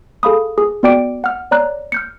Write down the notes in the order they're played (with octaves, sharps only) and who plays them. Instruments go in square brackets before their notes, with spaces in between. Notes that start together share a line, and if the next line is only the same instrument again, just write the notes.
[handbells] G#4 A4 F5 B5 D#6
G#4
B3 F#4 D5 G5 D6 D7
F#5 F6
C#5 D5 A#5 F#6
F6 G6 C#7